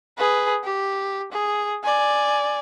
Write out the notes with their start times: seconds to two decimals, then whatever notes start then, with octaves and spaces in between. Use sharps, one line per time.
0.18 G#4 B4
0.64 G4
1.32 G#4
1.84 D5 G#5